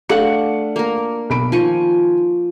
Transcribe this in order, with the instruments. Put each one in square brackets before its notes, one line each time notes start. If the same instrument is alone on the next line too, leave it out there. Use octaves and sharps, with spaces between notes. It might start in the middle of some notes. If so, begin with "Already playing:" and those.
[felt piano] A3 F5 C#7 [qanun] D4 F#5
[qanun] A#3 A#4
[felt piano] B1 B5 D7
[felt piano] D#3 [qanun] F3 G#5 C#6